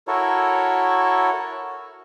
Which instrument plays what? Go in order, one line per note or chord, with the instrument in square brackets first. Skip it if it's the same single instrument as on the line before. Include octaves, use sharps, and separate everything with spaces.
[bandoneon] E4 F#4 A4 A#4 C#5